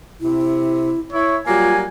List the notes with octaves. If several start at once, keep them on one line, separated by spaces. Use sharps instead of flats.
C3 E4
E4 C#5
F#3 G3 A#3 F4 G#5